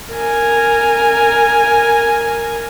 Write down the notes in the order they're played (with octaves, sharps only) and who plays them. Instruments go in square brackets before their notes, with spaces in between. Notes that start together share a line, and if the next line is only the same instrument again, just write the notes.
[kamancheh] A#4 G#5